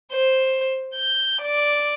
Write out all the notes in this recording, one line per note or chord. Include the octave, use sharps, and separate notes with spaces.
C5
G6
D5